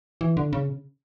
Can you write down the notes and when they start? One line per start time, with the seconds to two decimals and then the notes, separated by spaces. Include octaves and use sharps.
0.21 E3
0.37 D3
0.53 C#3